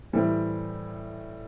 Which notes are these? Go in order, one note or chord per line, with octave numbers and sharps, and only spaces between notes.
A2 E3 G3 C4